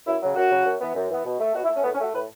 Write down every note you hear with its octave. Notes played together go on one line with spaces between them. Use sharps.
F#2 E4
C#3 F#3
F#2 F#4
C#3 F#3
F#2
E3 B3
F#2
E3 B3
B2
A3
B2 F#4
E4
A3
C#4
A2 B3
C#4
A3 F#4
A2 B4